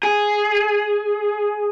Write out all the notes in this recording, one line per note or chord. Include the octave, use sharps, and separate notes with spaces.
G#4